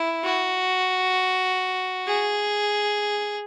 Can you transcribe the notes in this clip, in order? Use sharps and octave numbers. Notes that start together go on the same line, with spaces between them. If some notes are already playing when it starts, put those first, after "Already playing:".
Already playing: E4
F#4
G#4